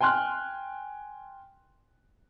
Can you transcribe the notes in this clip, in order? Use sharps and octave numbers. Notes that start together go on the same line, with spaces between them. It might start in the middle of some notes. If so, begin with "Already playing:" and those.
G5 G#5 C6 F6 F#6